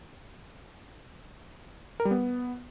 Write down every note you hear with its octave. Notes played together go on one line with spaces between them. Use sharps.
A#4
G3
B3